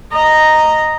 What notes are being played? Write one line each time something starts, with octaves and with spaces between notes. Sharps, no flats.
D#5 A#5